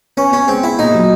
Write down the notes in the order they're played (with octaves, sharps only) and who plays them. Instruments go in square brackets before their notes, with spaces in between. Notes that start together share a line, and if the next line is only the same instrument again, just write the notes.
[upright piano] B3 [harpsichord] C#4
[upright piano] B3 [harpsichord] C#4
[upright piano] G#3 [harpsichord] C4
[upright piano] G#3 [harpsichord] E4
[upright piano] A#2 [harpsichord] D#4
[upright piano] F#3